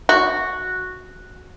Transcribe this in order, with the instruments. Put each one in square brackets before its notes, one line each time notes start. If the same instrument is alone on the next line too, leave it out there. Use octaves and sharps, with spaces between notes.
[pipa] F#4